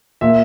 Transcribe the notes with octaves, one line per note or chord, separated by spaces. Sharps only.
A#2 E5